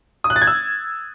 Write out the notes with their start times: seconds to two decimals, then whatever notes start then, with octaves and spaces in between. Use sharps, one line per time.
0.24 D#6
0.30 F#6
0.36 A6
0.42 G#6
0.47 E6